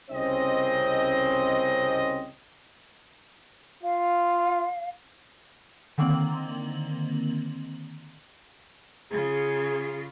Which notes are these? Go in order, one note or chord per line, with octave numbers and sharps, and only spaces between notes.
C2 C#3 C4 C#4 C5 D#5
F4 F5
D3 D#3 A#3 C4 F#7
C#3 F4 G#4